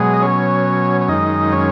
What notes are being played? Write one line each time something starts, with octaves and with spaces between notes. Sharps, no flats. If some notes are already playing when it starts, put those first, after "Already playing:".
Already playing: B2 F#3 G#3 G#4
D#5
C#4 C#5
C#5
F#2 D#3 G#3 D#4 D#5
C#4 C#5